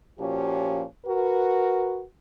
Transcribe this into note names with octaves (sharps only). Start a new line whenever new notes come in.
A#2 F3 C#4 F#4 G4
F#4 A#4 B4